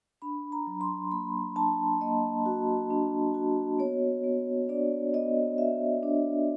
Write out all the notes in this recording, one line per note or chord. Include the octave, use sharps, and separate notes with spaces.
D4 B5
A#5
F#3
C6
A#3 B5
D4 A5
A#3 D#5
F#4
D4
F#4
B3 C#5
B3
D4 D5
B3 D#5
F#4 E5
D4